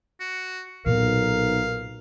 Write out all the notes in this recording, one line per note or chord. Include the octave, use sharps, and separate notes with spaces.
F#4
B1 A#2 B3 A#4 F5